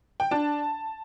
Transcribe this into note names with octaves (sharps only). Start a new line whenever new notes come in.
G5
D4 A5